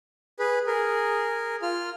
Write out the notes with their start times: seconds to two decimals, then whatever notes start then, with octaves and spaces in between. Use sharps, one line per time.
0.39 G#4 B4
0.67 G#4 A#4
1.62 F4 F6